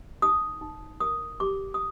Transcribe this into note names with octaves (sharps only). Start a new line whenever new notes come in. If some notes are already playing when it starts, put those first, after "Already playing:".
D#4 D#6
D#4
A#4 D#6
G4 D6
D#6